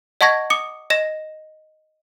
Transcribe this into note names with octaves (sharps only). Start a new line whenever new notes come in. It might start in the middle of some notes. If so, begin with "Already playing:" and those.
D#5 F#5 A5 C#6 G#6 A#6
D6 D#6 C#7
D#5 A#6 E7